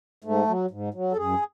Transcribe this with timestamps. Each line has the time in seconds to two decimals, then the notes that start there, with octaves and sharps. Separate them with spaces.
0.24 G#2 A3
0.48 F#3
0.71 G#2
0.94 F#3
1.12 A4
1.16 F#2 G#4